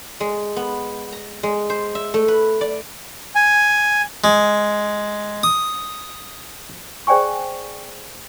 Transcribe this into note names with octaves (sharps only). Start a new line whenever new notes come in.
G#3
B3
A#5
G#3
C5
E5
A3
B4
D5
G#5
G#3
D#6
G#4 C5 D5 G5 G#5 C#6